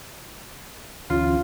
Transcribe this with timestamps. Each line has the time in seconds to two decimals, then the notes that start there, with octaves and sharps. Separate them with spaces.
1.10 D2 E3 C#4 F4